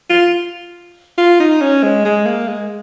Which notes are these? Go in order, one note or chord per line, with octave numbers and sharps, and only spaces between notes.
F4
F4
D#4
C#4
G#3
G#3
A#3
G#3